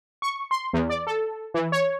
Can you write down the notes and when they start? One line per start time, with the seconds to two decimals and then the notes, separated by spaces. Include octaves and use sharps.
0.22 C#6
0.51 C6
0.73 E2
0.90 D5
1.07 A4
1.54 E3
1.72 C#5